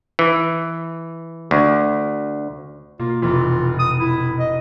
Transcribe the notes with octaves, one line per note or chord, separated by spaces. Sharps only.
E3
D2
B2 A#3 F4
F1 E3 F4
D#6
E4
D#5